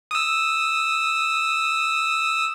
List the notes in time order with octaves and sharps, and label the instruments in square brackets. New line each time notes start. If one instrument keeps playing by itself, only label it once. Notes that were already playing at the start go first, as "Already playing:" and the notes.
[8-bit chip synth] D#6 E6